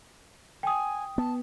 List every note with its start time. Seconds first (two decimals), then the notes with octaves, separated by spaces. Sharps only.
0.63 G5 G#5 D#6
1.18 B3 A5